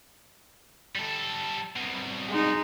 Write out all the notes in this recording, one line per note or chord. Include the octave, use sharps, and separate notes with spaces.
G3 A4
C2 B2
G#3 D#4